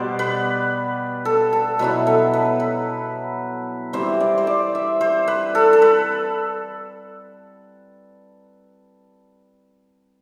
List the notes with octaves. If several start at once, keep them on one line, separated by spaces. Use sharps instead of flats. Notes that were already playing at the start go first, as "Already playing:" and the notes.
Already playing: B2 G3 B3 C5 D5
B4
A4
A4
B2 F#3 B3 E4 B4
A4
B4
B4
E3 G3 C4 C5
D5
C5
D5
E5
C5
B4
A4
A4
B4